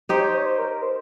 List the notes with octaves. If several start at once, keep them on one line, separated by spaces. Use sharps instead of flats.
D#4 G4 C5
C#5
C5
C#5
C5
A#4
A#4
C5